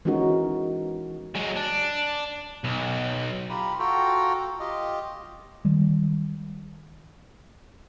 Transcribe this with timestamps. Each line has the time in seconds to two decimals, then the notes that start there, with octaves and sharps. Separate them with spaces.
0.05 E3 G#3 C#4 D#4 F#4 A#4
1.35 F#3 G#3
1.56 D4
2.64 B1
3.50 F4 G4 A#5 B5
3.79 F4 F#4 A4 G5 A#5
4.60 F4 G4 D#5
5.65 D#3 G3 G#3